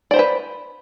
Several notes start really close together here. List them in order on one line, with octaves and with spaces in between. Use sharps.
D5 C5 A#5 B4